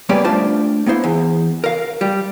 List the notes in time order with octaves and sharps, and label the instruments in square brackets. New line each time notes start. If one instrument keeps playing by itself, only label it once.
[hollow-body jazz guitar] G3 A#3 B3 C#4 D5
A3 D4 F4 C5 A5
A#3 B3 E4 C5
E2
A#4 F5
G3